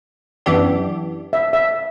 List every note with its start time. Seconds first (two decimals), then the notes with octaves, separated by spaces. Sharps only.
0.46 F#2 E3 B3 D4 G4
1.33 E5
1.53 E5